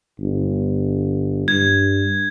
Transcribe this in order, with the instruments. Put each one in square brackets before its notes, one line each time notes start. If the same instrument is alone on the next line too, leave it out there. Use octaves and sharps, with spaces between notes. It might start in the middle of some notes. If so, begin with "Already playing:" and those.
[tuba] G1
[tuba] G2 [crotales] G#6